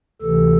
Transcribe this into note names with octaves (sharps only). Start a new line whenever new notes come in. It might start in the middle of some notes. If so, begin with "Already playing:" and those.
D2 C3 E3 A4